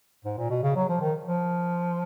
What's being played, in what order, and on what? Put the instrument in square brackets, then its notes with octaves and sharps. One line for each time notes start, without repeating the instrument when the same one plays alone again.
[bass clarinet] G#2
A#2
B2
C#3
F#3
F3
D#3
F3